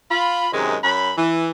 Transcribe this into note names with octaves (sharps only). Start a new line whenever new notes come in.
F4 B5
F#2 C3 D#3 G#3
F#2 C#4 B5
E3